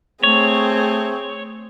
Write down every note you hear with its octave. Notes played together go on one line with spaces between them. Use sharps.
A3 C4 G#4 C#5